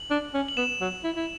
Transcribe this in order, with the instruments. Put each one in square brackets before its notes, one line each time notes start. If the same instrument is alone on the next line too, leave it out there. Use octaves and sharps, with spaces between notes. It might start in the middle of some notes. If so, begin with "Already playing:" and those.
Already playing: [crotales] F#7
[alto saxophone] D4
C#4
[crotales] F#7
[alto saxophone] B3 [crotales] E7
[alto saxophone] F#3
E4
E4